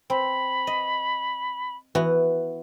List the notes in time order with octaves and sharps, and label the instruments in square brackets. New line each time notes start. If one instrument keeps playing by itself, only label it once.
[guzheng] C4 [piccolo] B5
[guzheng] D#5
E3 B3 F#4